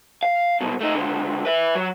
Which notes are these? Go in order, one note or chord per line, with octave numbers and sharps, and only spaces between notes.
F5
C2 B2
A3 D#4
C#2 D3
B4 E5
F#3